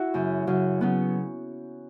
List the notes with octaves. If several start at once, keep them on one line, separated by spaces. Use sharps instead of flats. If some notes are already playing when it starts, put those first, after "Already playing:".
Already playing: E4 F#4
F#2 C#3 F#3
F#2 C#3 F#3
C#3 F#3 B3